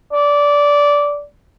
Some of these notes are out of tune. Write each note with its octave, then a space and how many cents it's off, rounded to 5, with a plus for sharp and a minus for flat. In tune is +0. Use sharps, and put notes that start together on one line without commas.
D5 -15